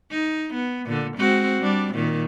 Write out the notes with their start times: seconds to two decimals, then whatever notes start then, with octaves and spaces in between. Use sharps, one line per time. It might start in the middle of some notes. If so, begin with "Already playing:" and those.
0.12 D#4
0.54 B3
0.86 A#2 D3
1.17 G#3 C4 F#4
1.62 G3 D4
1.94 A#2 D#3